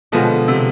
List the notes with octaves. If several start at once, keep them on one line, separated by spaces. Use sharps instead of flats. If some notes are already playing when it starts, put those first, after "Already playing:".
B2 D3 F3 G#3 B3
C3